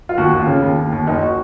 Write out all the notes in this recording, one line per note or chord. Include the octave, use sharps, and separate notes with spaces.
F4
D#2 F#4
D#2
F4
C#3
D#2
D#2
D#2
F#1 D#4
F#4